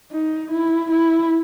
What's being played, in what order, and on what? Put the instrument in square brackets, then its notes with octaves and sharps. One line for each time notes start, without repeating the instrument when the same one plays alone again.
[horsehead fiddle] D#4
E4
E4